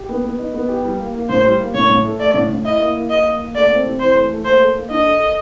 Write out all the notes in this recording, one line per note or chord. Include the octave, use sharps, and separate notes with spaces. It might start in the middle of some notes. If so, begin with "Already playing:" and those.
Already playing: G4
B3
B3
D#4
B3
G4
G3
A#3
A#3
A2 C5
G3
A#3
A2 C#5
A2
A3
A3 D5
A2
A2
E4 D#5
A#3
A#3
A#3 D#5
A#3
A#3
A3 D5
C4
C3
E3 C5
A3
A3
A#3 C5
A4
A#3
D4 D#5
A4
A4